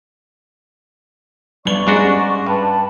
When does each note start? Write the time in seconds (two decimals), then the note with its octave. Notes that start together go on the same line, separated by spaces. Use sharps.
1.65 G1 D5 C#6 G7
1.87 G#2 G3 G#3 C#4 D4 F#4
2.46 G2 B4 A5 B5